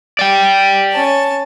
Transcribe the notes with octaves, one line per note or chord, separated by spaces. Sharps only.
D5 G5
C#4 A5